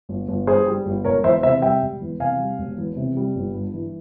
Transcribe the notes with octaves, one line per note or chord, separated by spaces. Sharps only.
G1
G1
G2 G#4 C5
G3
G1
E1 A#4 C#5
E2 C5 E5
C3 C5 E5
G3 E5 G5
E1
E2
C3 F5 G#5
G3
E1
E2
C3
G3
G1
G2
E3